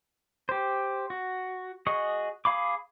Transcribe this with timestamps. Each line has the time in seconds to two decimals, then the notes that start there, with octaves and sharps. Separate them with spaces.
0.49 G4 C5
1.10 F#4
1.87 F#4 G#4 D#5 C#6
2.45 G#4 F5 B5 D6